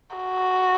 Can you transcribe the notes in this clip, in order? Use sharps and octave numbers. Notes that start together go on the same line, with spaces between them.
F#4